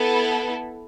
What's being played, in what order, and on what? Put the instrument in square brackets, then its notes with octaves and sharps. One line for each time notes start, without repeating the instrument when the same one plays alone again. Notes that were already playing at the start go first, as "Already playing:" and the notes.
Already playing: [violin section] B3 E4 A4